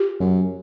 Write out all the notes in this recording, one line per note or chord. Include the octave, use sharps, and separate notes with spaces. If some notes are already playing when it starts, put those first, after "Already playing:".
Already playing: F4 G4
F#2